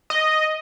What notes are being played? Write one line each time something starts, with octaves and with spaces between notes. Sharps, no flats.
D#5